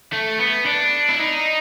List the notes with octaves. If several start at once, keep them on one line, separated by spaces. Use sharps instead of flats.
A3
B3
D4
E4
D#4